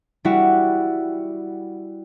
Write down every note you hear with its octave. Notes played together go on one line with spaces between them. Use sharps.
G3 E4 F#4